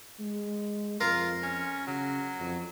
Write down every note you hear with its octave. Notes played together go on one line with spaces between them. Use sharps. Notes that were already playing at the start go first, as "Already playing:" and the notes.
G#3
F2 F4 A#4
C#4
C#3 F#3
F2